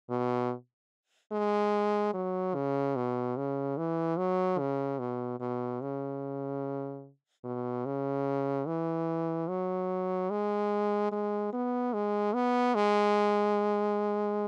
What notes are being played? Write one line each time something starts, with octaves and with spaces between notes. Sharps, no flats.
B2
G#3
F#3
C#3
B2
C#3
E3
F#3
C#3
B2
B2
C#3
B2
C#3
E3
F#3
G#3
G#3
B3
G#3
B3
G#3